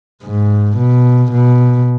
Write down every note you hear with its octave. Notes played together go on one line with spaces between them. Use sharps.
G#2
B2
B2